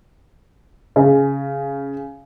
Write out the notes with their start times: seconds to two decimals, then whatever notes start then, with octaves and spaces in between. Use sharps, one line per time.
0.96 C#3